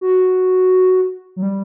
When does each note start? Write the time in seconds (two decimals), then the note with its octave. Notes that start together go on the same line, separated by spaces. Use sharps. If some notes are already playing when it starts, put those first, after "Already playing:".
0.01 F#4
1.36 F#3
1.42 G3